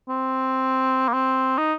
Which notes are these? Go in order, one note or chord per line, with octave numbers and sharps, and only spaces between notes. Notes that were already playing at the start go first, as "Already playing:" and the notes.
C4
A#3
C4
D#4